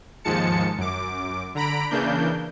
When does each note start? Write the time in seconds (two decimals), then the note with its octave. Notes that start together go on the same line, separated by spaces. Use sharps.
0.24 D#2 G#2 F3 G#3 A5 C#7
0.78 F#2 D6
1.55 D3 A#5 B5 D7
1.91 C#3 E3 A#3 D4 G6